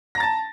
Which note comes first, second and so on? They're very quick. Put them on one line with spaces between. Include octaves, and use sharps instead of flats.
A#6 A#5 A6 A5